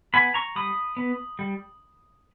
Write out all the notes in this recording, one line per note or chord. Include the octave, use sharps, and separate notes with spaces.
B3 G#5 B5
A#5 C#6
G3 B5 D#6
B3
G3